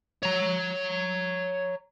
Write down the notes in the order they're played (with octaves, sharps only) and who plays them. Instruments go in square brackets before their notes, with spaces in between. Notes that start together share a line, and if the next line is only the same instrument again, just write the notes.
[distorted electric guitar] C#5 A#5